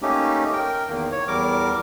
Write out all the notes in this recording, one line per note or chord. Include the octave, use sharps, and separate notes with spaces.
A3 A#3 C#4 D#4 G4
A#4 G5
E2 D#3 A#3
C#5
E2 G3 A#4 D6